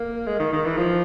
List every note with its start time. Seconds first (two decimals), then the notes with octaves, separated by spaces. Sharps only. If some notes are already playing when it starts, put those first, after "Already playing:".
Already playing: A#3
0.27 G#3
0.40 D#3
0.53 D#3
0.65 E3
0.77 F3